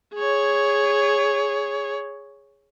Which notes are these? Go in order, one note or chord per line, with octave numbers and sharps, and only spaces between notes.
G#4 C#5